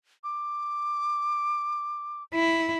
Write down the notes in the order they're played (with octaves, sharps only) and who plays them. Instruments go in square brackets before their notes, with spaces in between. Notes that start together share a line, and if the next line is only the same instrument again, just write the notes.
[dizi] D6
[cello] E4